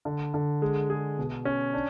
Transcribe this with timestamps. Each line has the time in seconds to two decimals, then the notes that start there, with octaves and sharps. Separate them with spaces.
0.05 D3
0.34 D3
0.62 G#3
0.90 G#4
1.18 B2
1.45 C#4
1.74 D4